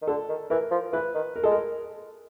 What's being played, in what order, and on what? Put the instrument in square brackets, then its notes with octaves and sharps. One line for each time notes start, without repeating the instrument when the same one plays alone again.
[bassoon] D#3
[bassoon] D3 [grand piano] A4
[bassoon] D#3
[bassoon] E3 [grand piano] A#4
[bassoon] F3
[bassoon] E3 [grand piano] B4
[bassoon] D#3
[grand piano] A#4
[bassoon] G#3 [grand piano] A4
[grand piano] A#4